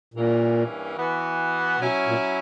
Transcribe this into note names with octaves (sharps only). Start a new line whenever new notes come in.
G2 A#2 E3 A#3 C#4
E3 B3 F#4
B2 F#3 C#4 E4
A#2